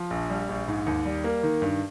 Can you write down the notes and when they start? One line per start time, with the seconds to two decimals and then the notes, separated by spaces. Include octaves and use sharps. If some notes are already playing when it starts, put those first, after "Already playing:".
Already playing: F3
0.10 A#1
0.29 G3
0.49 A#1
0.68 G#2
0.86 D#2
1.05 G3
1.24 A#3
1.43 D#3
1.62 G2